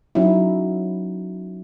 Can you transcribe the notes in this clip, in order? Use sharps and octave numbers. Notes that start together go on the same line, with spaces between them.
F#3 C#4 D#4 E4